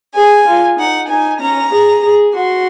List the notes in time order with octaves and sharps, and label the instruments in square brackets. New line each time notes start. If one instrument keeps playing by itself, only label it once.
[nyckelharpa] G#4 [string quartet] G#5
[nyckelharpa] F4
[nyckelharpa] D#4 [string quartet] F#5
[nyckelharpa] D#4 [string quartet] G#5
[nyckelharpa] C#4 [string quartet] A#5
[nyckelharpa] G#4
G#4
[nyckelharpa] F#4 [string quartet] C6